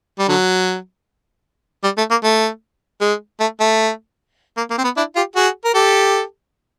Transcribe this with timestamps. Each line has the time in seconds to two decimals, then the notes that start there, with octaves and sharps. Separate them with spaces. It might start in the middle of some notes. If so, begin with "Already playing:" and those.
0.19 G3
0.28 D3 F#3
1.84 G3
1.98 A3
2.10 A#3
2.24 A3
3.01 G#3
3.40 A3
3.60 A3
4.57 A#3
4.70 A#3
4.78 C4
4.84 B3
4.97 D4 E4
5.16 F4 G4
5.36 F#4 G#4
5.65 A#4
5.75 G4 A4